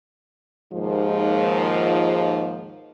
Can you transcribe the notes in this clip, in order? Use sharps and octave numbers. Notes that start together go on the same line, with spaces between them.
D#2 G#2 F3